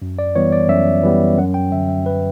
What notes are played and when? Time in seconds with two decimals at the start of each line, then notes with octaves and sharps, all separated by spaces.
0.02 F#2
0.19 D5
0.36 E3 G3 B3 C#5
0.52 D5
0.69 F#2 E5
1.03 E3 G3 B3
1.37 F#2 F#5
1.54 G5
1.72 D3 F#3 E5
1.88 E5
2.05 F#2 B4